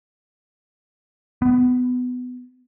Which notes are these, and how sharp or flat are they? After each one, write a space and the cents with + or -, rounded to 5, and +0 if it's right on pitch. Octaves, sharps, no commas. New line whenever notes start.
B3 +20